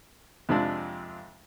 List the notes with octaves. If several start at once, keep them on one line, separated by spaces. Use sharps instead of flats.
F2 C3 F3 G#3 D4